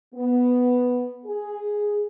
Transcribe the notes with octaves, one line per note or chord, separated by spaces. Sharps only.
B3
G#4